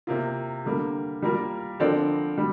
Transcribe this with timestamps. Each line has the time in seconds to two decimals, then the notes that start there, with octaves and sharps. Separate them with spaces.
0.07 C3 A#3 F4
0.65 D3 G3 A#3
1.22 G3 A#3 F4 A#4
1.80 D3 F3 C4 A#4 D5
2.38 G3